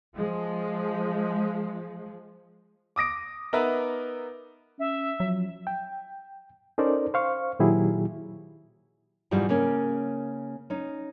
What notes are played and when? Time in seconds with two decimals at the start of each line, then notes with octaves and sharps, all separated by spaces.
0.15 F3 G#3
2.96 D6 D#6 A#6 D7
3.53 B3 D#4 A#4 B4 E5
4.79 C#4 E5
5.20 F3 F#3
5.67 G5
6.78 C#4 D#4 A4 A#4 C5 D5
7.14 C5 F5 C#6
7.59 A#2 D#3 F#3 E4 G4 G#4
9.31 G#2 B2 E3 G3 G#3 F4
9.49 C#3 A#3 C#4
10.70 C#4 D#4